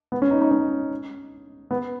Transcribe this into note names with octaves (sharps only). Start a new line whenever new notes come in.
B3
C#4
D#4
D#4
C#4
B3